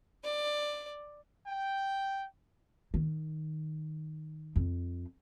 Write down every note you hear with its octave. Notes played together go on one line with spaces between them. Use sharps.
D5
G5
D#3
F2